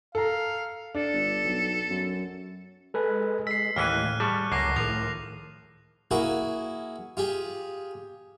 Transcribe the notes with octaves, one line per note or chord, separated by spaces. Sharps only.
A4 F5 A#5
D4 A4
G1
B1
F#2
G#3 A4 B4 G#5
E6 B6 C7
D#2 A2 E3 C#4 F6 F#6 D#7
G3 G#4 A5 C#6
C#2 F#2 A#3 D6 A#6 C7
A2 D#3 F3 A#4 F7
A#3 E4 F#4 G#4 A#4
F4 G4 G#4